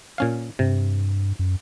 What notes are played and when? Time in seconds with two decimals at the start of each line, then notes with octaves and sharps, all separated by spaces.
0.18 A#2 C#4 F5
0.59 G2 C3
1.39 F#2